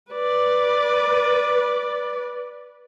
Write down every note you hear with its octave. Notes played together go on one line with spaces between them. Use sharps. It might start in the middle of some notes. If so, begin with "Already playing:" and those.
B4 D5